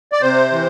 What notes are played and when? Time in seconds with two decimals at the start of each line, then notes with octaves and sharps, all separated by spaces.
0.13 D5
0.21 C3 C5
0.52 E3